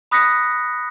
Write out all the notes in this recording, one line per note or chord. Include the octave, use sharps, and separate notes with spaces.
B5 D#6 F#6 A#6 B6 C#7